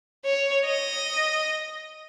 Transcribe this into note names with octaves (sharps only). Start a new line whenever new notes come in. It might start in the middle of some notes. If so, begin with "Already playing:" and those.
C#5
D#5